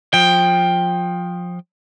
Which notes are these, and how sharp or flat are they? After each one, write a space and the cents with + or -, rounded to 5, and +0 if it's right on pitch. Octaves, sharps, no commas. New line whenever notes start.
F3 +20 G5 +10